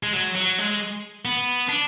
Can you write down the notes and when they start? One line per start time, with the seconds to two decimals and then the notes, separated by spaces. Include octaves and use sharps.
0.03 G#3
0.13 F#3
0.35 F#3
0.59 G#3
1.25 B3
1.69 D4